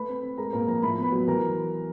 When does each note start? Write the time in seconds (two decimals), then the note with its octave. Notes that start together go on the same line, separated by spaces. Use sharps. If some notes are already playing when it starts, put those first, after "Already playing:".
Already playing: A3 B4 B5
0.09 C4
0.23 C4
0.38 G#3 A#4 A#5
0.53 A#2 A#4 A#5
0.67 F3 A#4 A#5
0.83 A2 B5
0.98 B3 B4 B5
1.12 F#3
1.27 E3 A#4 A#5